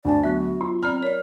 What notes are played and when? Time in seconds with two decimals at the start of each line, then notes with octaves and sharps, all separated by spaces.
0.05 D2 D4 D5 G#5 A5
0.24 F#3 B3 F#4 E5
0.61 F4 C6
0.83 C4 D5 A#5 B5 F6
1.03 A#4 C#5 D5